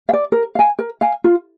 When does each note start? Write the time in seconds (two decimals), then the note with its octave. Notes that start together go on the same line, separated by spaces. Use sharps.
0.09 F5
0.13 D5
0.32 A#4
0.55 F5 G#5
0.79 A#4
1.01 F5 G#5
1.24 F4